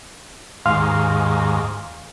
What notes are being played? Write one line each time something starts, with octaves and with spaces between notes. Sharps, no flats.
D#2 G#2 F5 C6 F6